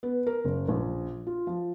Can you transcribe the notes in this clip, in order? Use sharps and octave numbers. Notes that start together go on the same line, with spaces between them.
B3
A#4
F#1
A#1
F4
F3